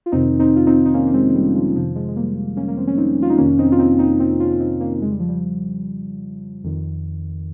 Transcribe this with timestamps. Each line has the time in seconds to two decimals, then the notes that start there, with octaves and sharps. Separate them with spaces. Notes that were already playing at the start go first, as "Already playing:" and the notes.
0.06 F4
0.12 F2 C3 D#3 C4 D#4
0.40 C4 D#4
0.56 F4
0.67 C4 D#4
0.86 D#4
0.94 A#3 C#4
1.07 A#3
1.14 G#3 C4
1.30 C4
1.35 G3 A#3
1.55 F3 G#3
1.75 F2 C3 D#3 F3
1.96 F3 G#3
2.08 G#3
2.16 G3 A#3
2.57 A#3 C#4
2.68 A#3
2.77 C4
2.87 C#4
2.97 C4 D#4
3.22 F4
3.30 D#4
3.38 F2 C3 D#3 A#3 C#4
3.58 C4 D#4
3.72 F4
3.79 C4 D#4
3.99 C4 D#4
4.20 C4 D#4
4.40 C#4 F4
4.52 F4
4.60 C4 D#4
4.80 A#3 C#4
5.01 F2 C#3 G#3
5.11 G3
5.19 F3
5.29 G3
6.64 F2 D#3